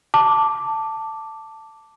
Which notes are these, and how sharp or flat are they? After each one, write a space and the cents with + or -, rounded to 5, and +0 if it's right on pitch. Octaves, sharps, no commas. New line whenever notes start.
A5 +10 D6 +0